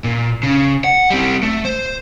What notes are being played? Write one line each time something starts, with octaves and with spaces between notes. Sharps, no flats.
A#2
C#3
F#5
G3 C4
A3
C5